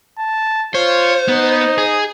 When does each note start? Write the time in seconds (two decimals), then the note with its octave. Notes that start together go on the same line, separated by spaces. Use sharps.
0.18 A5
0.75 F4 C5 C#5
1.28 B3 D#4
1.78 G#4